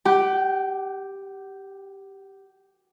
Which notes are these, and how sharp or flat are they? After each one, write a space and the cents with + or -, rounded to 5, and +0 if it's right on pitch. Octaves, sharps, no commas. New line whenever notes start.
G4 +0 F#5 +40